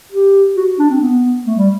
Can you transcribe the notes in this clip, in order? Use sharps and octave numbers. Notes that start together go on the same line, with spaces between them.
G4
F#4
D4
C4
B3
A3
G3